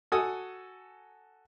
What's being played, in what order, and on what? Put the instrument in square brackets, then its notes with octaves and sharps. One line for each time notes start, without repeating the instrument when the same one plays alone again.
[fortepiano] F#4 A4 G#5 D#6